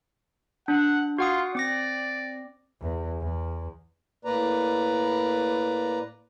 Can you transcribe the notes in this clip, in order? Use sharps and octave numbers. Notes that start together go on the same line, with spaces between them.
D4 F#5
F4 F#4 F#5 D#6
C4 D5 D6 A#6
E2
E2
A2 A#3 B4 D5 A#5